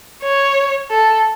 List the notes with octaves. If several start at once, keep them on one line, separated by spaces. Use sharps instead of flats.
C#5
A4